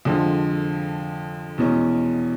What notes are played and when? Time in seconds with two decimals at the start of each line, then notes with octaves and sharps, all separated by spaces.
0.05 F2 D3 F3 G#3
1.58 E2 B2 G#3 C#4